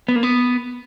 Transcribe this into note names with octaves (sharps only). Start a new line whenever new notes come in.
B3
A#3
B3